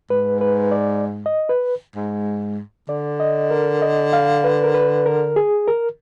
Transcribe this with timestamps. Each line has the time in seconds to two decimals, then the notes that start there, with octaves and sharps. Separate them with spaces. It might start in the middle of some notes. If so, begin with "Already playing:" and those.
0.10 G#2 B4
0.41 B4
0.71 D5
1.26 D#5
1.49 B4
1.96 G#2
2.88 D3 D5
3.20 D#5
3.51 A#4
3.82 D#5
4.13 F5
4.44 B4
4.64 A#4
4.74 B4
5.06 A#4
5.36 G#4
5.68 A#4